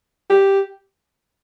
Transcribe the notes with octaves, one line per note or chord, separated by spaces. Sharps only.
G4